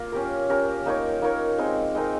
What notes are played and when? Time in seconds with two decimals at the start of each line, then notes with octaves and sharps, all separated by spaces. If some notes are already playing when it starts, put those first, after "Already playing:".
Already playing: A#3 F4
0.12 C#4 G4 A#4
0.49 C#4 G4 A#4
0.86 A#3 D#4 A#4 C#5
1.22 A#3 D#4 A#4 C#5
1.58 G#3 C4 D#4 A#4
1.95 G#3 C4 D#4 A#4